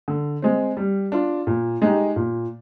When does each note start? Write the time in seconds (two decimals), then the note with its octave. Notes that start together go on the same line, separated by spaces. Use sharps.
0.08 D3
0.42 G#3 C4
0.77 G3
1.12 D4 F4
1.47 A#2
1.82 G#3 D#4 G4
2.16 A#2